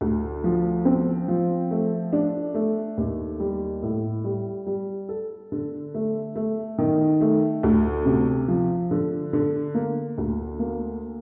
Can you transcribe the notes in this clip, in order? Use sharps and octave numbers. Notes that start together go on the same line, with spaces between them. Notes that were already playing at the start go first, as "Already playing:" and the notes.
D2
F3
C4
F3
A3
D4
A3
D#2
G3
A2
G3
G3
A4
D3
A3
A3
D#3
A3
D2
C3
F3
D3
D3
A#3
D2
A#3